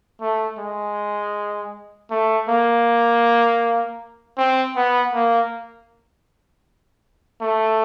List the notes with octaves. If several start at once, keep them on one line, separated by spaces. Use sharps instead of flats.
A3
G#3
A3
A#3
C4
B3
A#3
A3